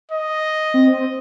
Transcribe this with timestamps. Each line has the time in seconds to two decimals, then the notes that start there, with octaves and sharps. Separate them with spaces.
0.11 D#5
0.74 C4